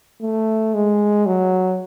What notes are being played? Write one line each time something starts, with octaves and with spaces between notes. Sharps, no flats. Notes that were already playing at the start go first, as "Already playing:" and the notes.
A3
G#3
F#3